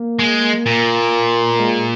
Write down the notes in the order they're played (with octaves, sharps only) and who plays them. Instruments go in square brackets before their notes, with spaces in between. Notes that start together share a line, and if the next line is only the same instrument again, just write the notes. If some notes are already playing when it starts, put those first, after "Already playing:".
Already playing: [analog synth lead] A#3
[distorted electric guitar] G#3
A#2
[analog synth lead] A#3
G#3